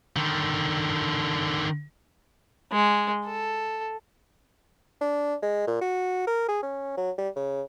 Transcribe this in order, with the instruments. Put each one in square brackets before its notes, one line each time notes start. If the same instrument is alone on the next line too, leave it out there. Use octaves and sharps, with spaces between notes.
[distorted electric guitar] D3 D#3
[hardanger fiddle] G#3
A4
[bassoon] D4
G#3
A#2
F#4
A#4
G#4
C#4
F#3
G3
C#3